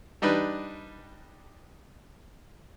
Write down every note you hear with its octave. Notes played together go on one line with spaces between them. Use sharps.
G3 D4 D#4 B4